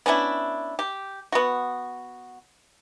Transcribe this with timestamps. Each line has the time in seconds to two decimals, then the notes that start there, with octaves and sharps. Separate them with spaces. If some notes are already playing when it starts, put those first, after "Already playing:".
0.06 B3 C#4 D4 E4
0.79 G4
1.32 B3 F#4